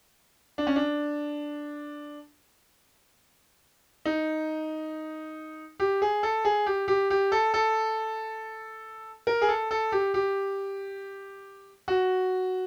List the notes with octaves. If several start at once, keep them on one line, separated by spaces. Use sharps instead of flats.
D4
C#4
D4
D#4
G4
G#4
A4
G#4
G4
G4
G4
A4
A4
A#4
G#4
A4
A4
G4
G4
F#4